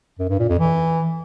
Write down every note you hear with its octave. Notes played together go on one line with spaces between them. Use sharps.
F#2
G2
A#2
F2
E3